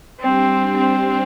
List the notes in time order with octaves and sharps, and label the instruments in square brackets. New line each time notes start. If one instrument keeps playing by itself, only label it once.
[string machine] G3 D4 G4 C5 [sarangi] C4
[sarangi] C4